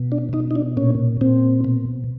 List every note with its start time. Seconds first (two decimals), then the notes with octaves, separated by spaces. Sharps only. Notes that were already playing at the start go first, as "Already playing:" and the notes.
Already playing: B2
0.12 D4
0.33 B2 D#4
0.51 D#4
0.56 D4
0.77 A#2 C#4
1.21 A#2 C4
1.64 B2